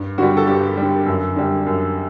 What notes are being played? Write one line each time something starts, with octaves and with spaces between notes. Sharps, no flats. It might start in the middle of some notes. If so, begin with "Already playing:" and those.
Already playing: G2
D3 G3 F#4
A4
G2 G4
D3 G3
F#2
D3 G3
F#2